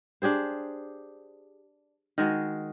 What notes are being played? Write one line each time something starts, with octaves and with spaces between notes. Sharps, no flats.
D4 G4 G#4 C5
D#3 G#3 F#4